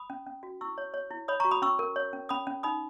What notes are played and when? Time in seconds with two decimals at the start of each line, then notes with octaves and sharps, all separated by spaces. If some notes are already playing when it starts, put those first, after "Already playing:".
Already playing: B5 D#6
0.10 C#4
0.27 C#4
0.43 F#4
0.61 E4 C#6 E6
0.78 C#5
0.94 C#5
1.11 E4
1.28 C#5 B5 D#6
1.40 A#5 C#6
1.45 F#4
1.51 B5 D#6
1.62 C#4 C#6 E6
1.79 A#4
1.96 C#5
2.13 C#4
2.29 C#4 B5 D#6
2.47 C#4
2.63 D#4 B5 D#6